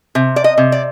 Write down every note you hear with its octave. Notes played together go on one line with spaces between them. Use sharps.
C3
D5
D#5
C3
D5